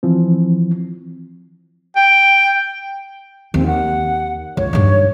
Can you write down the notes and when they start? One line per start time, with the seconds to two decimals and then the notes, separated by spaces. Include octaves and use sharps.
0.03 E3 F3 C4
1.96 G5
3.54 D#2 C4
3.66 F#5
4.57 C#2 C#5
4.73 G2 D#4